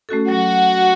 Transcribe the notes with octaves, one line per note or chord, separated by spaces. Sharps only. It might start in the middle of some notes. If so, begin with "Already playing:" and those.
A3 C#4 F#4 A4
F#3 F#4